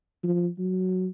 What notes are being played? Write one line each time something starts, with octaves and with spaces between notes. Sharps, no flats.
F3
F#3